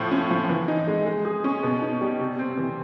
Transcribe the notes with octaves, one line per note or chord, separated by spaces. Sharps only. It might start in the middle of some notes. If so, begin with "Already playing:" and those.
Already playing: A2 F3
C#4
F3
E3
D#4
G#3
G#3
G#4
C#4
B2
D#4
G3
C3
C4
E3